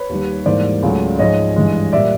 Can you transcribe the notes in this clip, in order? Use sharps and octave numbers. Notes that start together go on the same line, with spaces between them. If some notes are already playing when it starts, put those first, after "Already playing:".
Already playing: B4 C#5
D#2 D#3 G3
G#2 E3 G3 A#3 C5 D5
C#2 C#3 F#3 A3
G#2 F3 G#3 C#5 D#5
G2 E3 G#3
A#2 G3 A#3 D5 E5